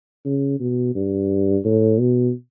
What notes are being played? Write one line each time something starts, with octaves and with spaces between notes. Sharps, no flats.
C#3
B2
G2
A2
B2